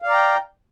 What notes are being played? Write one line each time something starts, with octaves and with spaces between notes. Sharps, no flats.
D5 F5 G5 A#5